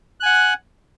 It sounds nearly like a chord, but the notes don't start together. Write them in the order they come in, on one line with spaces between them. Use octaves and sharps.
F#6 G#5 F#5